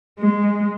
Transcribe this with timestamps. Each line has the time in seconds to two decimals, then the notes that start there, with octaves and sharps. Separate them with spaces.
0.19 G#3